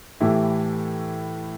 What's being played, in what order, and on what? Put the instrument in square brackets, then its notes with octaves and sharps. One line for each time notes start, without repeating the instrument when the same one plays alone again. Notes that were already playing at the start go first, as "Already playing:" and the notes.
[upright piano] A2 E3 A3 E4 G4